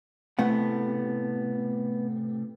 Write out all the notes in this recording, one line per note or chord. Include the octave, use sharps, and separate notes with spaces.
A2 C3 A3 B3 F#5